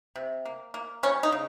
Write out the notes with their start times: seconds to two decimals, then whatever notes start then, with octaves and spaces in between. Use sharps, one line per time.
0.16 C3
0.45 A#3
0.74 A#3
1.03 G3 C#4
1.23 D#4
1.32 C#3